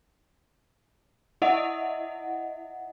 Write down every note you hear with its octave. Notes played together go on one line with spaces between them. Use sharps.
E4 D#5 E5 F#5